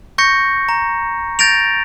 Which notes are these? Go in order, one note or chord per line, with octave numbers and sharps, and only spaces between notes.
C#6 G6 A#6 C#7
A#5
G6 A6 A#6 D7 F7